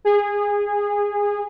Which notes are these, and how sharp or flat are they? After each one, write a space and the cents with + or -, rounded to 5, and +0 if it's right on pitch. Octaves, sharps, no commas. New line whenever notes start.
G#4 -20